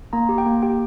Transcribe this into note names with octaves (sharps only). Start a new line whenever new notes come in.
A#3 A#5
G4
G5
A#3
G4 G5